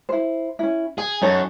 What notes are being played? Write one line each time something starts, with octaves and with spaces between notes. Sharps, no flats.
E4 C5
C#4 E4
G#4 G#5
F#2 D#4 A4 C#5